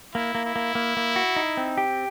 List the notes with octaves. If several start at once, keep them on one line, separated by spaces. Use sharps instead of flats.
A#3 E4
A#3
E4
A#3
A#3
A#3
F#4
D#4
C4
G4